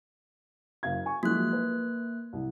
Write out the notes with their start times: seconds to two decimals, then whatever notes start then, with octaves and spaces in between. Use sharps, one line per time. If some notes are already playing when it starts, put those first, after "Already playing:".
0.83 F#1 F5 G#6
1.06 G#5 C#6
1.23 F3 F#3 G#3 A#3 F#6
1.53 B4
2.33 C2